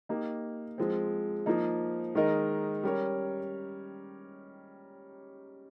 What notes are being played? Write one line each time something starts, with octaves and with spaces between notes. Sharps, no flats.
A#3 D#4 G4
F3 G#3 C4
F3 A#3 D#4
D#3 G#3 D#4 A#4 D#5
G3 C#4 G4 A#4 C#5